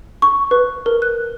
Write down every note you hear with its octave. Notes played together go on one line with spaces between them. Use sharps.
C#6
B4
A#4
F#6